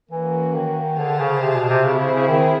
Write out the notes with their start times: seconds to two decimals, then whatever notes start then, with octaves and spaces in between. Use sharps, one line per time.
0.11 E3 A#3 C#4 F#4
0.55 D#3
0.98 D3 G#4 C5 F5 A5
1.20 C#3
1.42 C3
1.56 B2
1.70 C3
1.84 C#3 C4 E4 G#4
1.99 C#3
2.13 C#3
2.28 D#3